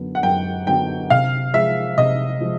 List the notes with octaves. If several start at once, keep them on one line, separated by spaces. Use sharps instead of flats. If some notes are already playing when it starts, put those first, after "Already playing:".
Already playing: F#2 D3 F#3 B3 D4
F#5
F#2 G5
D3 F#3 B3 D4 G5
C3 F5
F3 G#3 E5
C3 D#5
F3 G#3